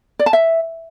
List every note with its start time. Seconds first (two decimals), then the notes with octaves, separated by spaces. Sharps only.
0.19 D5
0.26 A5
0.33 E5